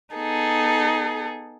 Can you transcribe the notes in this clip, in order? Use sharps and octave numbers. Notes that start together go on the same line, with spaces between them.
B3 D#4 G#4 A4